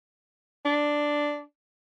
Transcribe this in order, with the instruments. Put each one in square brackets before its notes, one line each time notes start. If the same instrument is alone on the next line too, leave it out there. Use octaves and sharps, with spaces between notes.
[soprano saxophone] D4